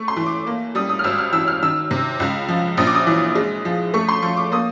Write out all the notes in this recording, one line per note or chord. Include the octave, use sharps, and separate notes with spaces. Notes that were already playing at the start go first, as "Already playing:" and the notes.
Already playing: A3 C#6
C6
E3
D6
A#3
G3 D#6
D#6
F6
G#1 E6
F6
E3 E6
F6
D#3 E6
C3
C#2
F3
A#1 D#6
D6
D#6
E3
G#3
F3
A3 C#6
C6
F3 C#6
D6
A#3 D#6